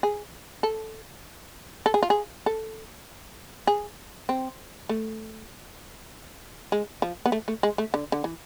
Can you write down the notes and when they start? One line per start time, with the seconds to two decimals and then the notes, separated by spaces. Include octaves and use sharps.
0.03 G#4
0.63 A4
1.86 A4
1.94 G#4
2.03 F4
2.10 G#4
2.46 A4
3.67 G#4
4.29 C4
4.89 A3
6.72 G#3
7.02 F3
7.26 B3
7.32 A3
7.48 A3
7.63 G#3
7.78 A3
7.94 D3
8.12 D3
8.24 E3